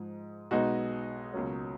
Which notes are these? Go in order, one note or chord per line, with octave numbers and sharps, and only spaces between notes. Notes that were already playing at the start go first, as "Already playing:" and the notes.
Already playing: G#2 F3 G#3
B1 B2 G#3 B3 D#4 F#4
C#2 B2 F#3 A#3 C#4